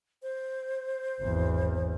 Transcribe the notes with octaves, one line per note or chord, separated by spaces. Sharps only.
C5
G#1 E2